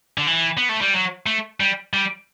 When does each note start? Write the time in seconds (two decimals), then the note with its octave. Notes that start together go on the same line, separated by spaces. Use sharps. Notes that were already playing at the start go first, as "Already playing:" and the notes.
0.18 D3
0.27 E3
0.57 B3
0.69 A3
0.81 G3
0.94 F#3
1.26 A3
1.60 G3
1.94 G3